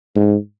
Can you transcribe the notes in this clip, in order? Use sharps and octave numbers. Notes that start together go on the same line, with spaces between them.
G#2